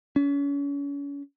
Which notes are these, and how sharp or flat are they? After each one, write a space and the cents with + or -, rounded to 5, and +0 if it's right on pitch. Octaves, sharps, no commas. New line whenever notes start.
C#4 +35